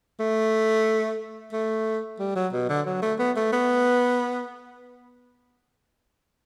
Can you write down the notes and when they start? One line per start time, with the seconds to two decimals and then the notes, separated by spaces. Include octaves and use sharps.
0.20 A3
1.53 A3
2.19 G3
2.36 F#3
2.53 B2
2.69 D3
2.86 F#3
3.02 A3
3.19 B3
3.36 A3
3.52 B3